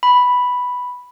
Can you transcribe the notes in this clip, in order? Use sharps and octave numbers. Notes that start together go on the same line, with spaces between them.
B5